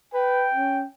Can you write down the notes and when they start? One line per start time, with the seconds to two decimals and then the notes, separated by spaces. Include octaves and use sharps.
0.14 B4 G5
0.54 C#4